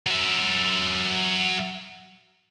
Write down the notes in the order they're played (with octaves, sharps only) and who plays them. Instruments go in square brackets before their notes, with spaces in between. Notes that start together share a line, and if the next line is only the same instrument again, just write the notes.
[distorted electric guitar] F#3 E5